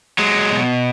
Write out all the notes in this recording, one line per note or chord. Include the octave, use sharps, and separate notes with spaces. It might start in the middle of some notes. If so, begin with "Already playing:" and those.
F#3 G#3
B2